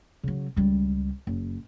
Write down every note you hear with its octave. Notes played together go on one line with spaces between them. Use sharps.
C#3 F#3
C#2 G3
F#1